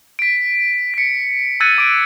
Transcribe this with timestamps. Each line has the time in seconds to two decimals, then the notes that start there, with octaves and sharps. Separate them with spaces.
0.19 B6 D7
0.94 B6 C#7
1.60 E6 F#6 G#6 A6 C#7 D#7
1.78 D6 D7